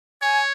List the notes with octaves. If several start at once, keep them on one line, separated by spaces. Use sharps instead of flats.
C#5 G#5